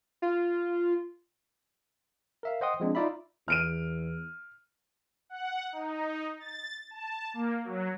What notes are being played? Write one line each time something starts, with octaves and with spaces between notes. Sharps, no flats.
F4
A#4 E5 F5
C5 D#5 F#5 G5 C6 D#6
F3 G#3 C4 D4
D#4 F4 D5 E5 B5
E2 F6 D7 D#7
F#5
D#4
A6
A5
A#3
F#3